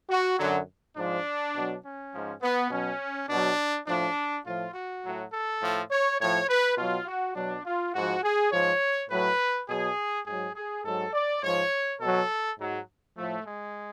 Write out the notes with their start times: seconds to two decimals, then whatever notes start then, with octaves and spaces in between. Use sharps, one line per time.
0.10 F#4
0.38 F#2 D3 F#3
0.97 G#2 F3 D4
1.55 B2 F#3
1.84 C#4
2.13 G#2 F3
2.42 B3
2.71 B2 F#3 C#4
3.29 B2 F#3 D4
3.87 A2 F3 D4
4.45 A2 F3 F4
4.74 F#4
5.04 A2 F#3
5.32 A4
5.61 A2 F3
5.91 C#5
6.19 A2 F3 C#5
6.49 B4
6.77 B2 F#3 F4
7.07 F#4
7.36 B2 F#3 D4
7.65 F4
7.94 G#2 F3 F#4
8.23 G#4
8.52 G#2 F3 C#5
9.10 A2 F#3 B4
9.68 B2 F#3 G#4
10.26 G#2 F#3 G#4
10.56 G#4
10.84 G#2 F#3 A4
11.13 D5
11.42 G#2 F3 C#5
12.00 B2 F#3 A4
12.59 G#2 F#3
13.16 A2 F3 A3
13.46 G#3